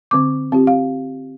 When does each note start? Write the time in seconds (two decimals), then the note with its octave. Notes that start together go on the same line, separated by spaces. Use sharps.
0.11 D3 C4 D6
0.52 C4 F4 G4
0.67 F5